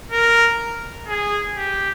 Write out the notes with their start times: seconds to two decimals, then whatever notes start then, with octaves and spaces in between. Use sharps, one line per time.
0.11 A#4
1.08 G#4
1.56 G4